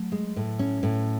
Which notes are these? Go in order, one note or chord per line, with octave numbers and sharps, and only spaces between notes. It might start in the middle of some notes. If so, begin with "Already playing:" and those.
Already playing: F#3 A3
G#3
A2
C#4
A2